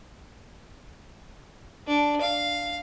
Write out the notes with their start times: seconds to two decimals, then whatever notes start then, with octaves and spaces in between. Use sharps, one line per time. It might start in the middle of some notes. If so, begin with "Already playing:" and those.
1.87 D4
2.21 F5